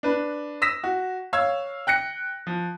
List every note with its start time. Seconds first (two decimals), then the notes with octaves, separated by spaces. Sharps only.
0.03 D4 B4
0.62 D#6 E6 A#6 B6 E7
0.84 F#4
1.33 C#5 F5 E6 G#6
1.87 G5 F#6 A#6 C#7
2.47 F3